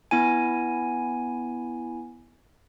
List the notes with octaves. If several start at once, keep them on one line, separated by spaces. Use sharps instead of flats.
B3 E4 G#5